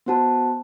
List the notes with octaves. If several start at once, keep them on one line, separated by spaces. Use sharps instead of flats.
B3 F#4 C5 F#5 A5